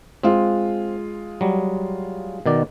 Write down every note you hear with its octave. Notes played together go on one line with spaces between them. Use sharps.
G#3 C4 F4
F#3 G3
B2 D#3 D5